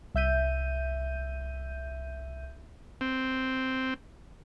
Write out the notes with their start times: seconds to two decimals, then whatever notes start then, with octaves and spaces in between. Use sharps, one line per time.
0.14 C2 E5 G6 D#7
3.01 C4